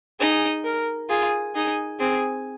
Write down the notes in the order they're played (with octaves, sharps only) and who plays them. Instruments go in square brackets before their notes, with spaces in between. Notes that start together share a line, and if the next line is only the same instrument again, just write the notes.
[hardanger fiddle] D#4 [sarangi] G#4
[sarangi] A#4
[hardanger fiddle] F4 [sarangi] G#4
[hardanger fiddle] D#4 [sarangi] G#4
[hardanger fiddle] C4 [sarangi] G#4